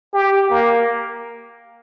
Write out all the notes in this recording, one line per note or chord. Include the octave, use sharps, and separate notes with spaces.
G4
A#3